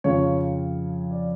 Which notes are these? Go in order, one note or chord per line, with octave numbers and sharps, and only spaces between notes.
F2 C#3 F3 C#5
D5